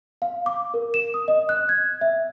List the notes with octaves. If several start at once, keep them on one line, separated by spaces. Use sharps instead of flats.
F5
D6
A#4
E7
D#6
D#5
F#6
G#6
E5